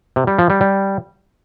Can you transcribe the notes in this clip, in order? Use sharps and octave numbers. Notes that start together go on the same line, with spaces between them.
C3
G3
F3
G3
G3